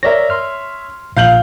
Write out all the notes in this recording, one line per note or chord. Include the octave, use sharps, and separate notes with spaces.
A#4 C#5 D5 E5 A#6
C6 F6
A#1 A#2 F5 G6 F#7